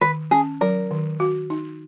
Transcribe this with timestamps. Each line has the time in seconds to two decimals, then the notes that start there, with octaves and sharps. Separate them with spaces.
0.01 D#3 B4
0.31 C#4 G#4
0.61 F#3 A#4
0.91 D#3
1.20 F#4
1.50 D#4